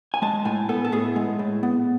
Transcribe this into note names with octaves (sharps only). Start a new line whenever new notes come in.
G#5
G#3 A5
A2 G#5
B3 A4
A4
A2 G#4
G#3
A2
B3